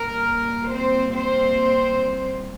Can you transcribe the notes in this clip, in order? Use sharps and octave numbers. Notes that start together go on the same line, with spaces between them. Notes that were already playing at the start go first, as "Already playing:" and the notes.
Already playing: A#2 G3 A#3 A#4
C4 C5
C4 C5